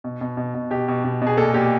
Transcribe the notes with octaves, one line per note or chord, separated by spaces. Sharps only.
B2
B2
B2
B2
B2 G4
B2
B2
B2
G#4
A#2 A4
A#2 G4